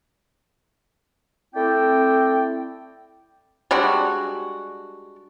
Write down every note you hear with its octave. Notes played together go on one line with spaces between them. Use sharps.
A3 C4 E4 D5 G5
G3 G#3 D4 F#4